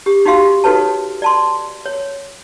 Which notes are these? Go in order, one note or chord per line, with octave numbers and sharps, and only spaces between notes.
G4
D#4 F#4 G4 F5 C6
D#4 F#4 A4 B4 C#5 A5
D5 A5 C6
C#5